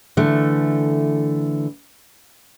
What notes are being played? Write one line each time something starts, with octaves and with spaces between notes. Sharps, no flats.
D3 E3 A3